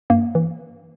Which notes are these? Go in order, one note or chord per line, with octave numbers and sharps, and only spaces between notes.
G2 A#3
E3